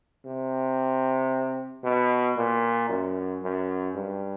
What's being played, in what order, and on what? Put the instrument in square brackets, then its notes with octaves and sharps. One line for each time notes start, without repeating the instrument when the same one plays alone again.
[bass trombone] C3
B2
A#2
F#2
F#2
G2